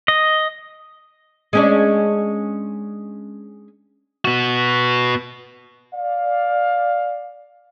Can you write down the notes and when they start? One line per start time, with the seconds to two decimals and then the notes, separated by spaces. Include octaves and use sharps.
0.08 D#5
1.53 G#3 C#4 D4
4.25 B3 F#4
5.94 D5 F5